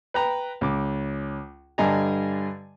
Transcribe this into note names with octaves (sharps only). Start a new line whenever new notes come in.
B4 G5 A#5
C#2 D6
G2 D3 D#5 G#5 A#5